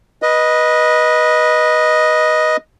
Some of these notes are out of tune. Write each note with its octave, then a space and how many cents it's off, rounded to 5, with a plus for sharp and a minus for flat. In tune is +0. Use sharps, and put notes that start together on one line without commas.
B4 -20 D#5 +0